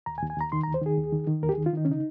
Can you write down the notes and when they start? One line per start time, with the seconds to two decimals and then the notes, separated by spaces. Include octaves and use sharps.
0.06 D#2 A#5
0.18 G#5
0.22 D#2
0.30 G#5
0.36 D#2 A#5
0.52 D#3 C6
0.64 A#5
0.67 D#2
0.74 C5
0.82 D#3 G#4
0.98 D#2
1.12 D#3
1.27 D#3
1.43 D#2 A#4
1.49 G4
1.54 G#4
1.57 D#3
1.66 F4
1.73 D#3 D#4
1.85 C#4
1.88 C#3 D#4